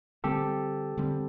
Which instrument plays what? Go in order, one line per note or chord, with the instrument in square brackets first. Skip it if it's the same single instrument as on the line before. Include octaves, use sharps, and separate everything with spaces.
[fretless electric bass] D3 G3 C4 [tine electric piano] G4 A4
[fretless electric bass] D3 G3 C4